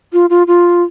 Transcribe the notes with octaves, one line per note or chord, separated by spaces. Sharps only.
F4
F4
F4